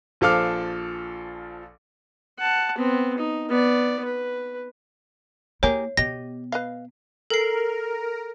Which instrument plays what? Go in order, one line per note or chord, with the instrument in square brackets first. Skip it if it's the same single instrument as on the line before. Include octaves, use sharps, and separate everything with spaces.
[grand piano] A#1 F3 A4 F5 D6 F6
[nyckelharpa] F#5 A5
B3 C4
D#4
B3 D5
B4
[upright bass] A#3 E4 [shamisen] G4 G#4 A#4 [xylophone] C#5
[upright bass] B2 B3 [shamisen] G4 D#5 [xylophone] A#6
[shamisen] B4 D#5 F5
[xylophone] A4 C7 [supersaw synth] A#4